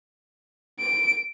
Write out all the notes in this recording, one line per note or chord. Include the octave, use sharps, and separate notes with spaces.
D7